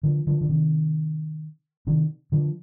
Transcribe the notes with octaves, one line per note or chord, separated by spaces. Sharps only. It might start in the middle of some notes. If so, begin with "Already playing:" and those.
D3 F3
D3 F3
D3
C3 D#3
C3 D#3
D3 F3